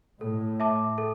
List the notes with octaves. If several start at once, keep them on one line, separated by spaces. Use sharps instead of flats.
A2 A4
E5 A5 D6
A4